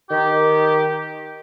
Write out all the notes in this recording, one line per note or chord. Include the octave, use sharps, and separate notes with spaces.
D#3 G4